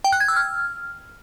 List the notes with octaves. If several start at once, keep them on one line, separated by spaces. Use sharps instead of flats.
G5
F#6
G#6
E6
F6